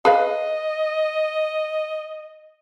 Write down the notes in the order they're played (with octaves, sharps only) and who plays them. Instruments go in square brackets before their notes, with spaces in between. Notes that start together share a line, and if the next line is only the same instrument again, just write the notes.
[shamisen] G#4 B4 F5 [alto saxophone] D#5